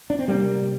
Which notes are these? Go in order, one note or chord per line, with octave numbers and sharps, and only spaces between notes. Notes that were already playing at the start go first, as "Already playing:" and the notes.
D4
C4
C3 G3 A#3